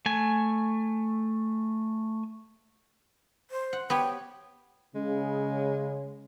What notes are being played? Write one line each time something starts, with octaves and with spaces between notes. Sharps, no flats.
A3 G#5
C5
F#5
B3 G4 C#5 G5
C#3 G#3